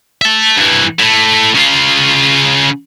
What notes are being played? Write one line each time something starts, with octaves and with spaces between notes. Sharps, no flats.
E5 A5
G2 E3
A2 A3
C#3 F4